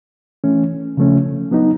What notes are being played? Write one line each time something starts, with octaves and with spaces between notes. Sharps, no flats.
E3 A3 C#4
C#3 F3 A3 C#4
F#3 B3 D#4